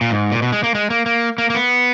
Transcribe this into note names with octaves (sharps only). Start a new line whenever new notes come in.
A#2
G#2
A#2
B2
G#3
A#3
G#3
A#3
A#3
A#3
A#3
B3